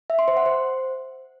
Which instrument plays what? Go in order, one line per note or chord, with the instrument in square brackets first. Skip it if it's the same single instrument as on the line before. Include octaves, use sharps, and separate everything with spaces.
[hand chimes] E5
C6
C5
F#5
C5